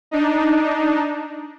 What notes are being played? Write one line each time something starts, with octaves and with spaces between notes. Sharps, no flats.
D4 D#4